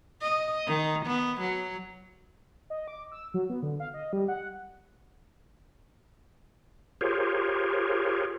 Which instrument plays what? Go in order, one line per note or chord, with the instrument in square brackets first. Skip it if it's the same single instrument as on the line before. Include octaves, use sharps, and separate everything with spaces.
[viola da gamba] D#5
D#3
B3
F#3
[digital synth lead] D#5
D6
E6
F#3
B3
D3
F5
D#5
G3
F#5
[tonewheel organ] F4 G4 G#4 A#4 C5 C#5